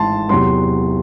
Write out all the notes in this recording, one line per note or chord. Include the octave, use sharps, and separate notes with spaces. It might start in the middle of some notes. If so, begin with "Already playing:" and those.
Already playing: G#1 G#2 E3 A5 C6
E2 C3 F#3 C6